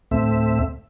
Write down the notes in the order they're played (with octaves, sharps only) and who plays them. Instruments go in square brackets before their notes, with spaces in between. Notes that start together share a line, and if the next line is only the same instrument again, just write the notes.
[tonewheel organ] D2 A2 A3 C4 E5